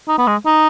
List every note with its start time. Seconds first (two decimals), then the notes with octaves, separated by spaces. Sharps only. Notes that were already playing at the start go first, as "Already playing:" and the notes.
0.08 D#4
0.18 B3
0.27 G#3
0.46 D#4